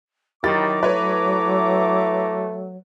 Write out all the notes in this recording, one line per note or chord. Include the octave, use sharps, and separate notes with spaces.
D#3 F#3 E4 G4 A#5 B5 D6 A6
A3 B4 C#5